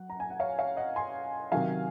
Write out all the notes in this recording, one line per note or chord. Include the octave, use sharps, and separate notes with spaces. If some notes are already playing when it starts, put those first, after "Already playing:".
Already playing: F#3 F#5
A#5
G#5
F#5
C#5 F5
C#5 F5
D#5 F#5
G#5 C6
C3 D#3 F#3 F5 G#5